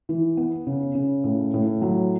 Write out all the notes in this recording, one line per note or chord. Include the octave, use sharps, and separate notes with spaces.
E3
B3
C#3
C#3
A2
A2
F#3